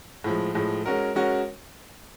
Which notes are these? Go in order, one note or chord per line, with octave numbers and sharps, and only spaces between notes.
A2 F3 G#3
A2 F3 G#3
G#3 C#4 F#4 A#4
G#3 C#4 F#4 A#4